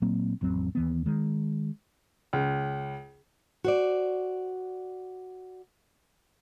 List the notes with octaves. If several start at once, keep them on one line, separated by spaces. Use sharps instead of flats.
A#2 F#3 A#3 C4
A1 F2 F#3 C4
D#2 E3 B3
D#3 G#3
C#2
F#4 C5 D5